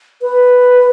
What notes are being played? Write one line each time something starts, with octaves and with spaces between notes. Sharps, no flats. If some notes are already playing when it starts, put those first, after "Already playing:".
B4